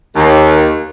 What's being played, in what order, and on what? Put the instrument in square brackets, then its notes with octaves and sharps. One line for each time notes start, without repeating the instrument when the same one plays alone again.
[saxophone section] D#2